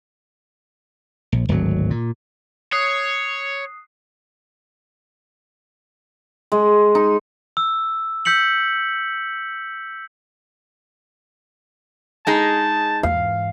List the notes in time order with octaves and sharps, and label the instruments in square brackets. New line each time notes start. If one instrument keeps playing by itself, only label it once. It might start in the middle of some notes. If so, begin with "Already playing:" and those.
[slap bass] A#1
D1 G#1 F#3
A#2
[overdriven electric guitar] C#5 [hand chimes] D#6 F#6 C7
[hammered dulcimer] G#3
D#4
[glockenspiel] E6
E6 G6 B6 C#7 F#7
[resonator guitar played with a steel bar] G#3 D#4 G#4 [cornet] A5
[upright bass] E2 G#2 [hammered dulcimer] F5